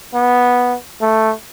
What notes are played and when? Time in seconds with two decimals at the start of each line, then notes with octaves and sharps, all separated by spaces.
0.14 B3
1.01 A3